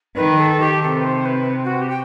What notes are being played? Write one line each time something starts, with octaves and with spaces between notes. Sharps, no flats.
D#3 B4
A4
G4
C3 A4
B4
C5
B4
F#4
G4
G5